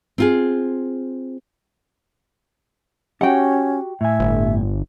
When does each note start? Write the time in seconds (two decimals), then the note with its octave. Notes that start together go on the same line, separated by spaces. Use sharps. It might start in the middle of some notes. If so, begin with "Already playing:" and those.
0.18 C4 F4 G#4
3.21 C#4 F#4 G4 F#5 G5
4.01 A2 E5 G#5
4.20 G1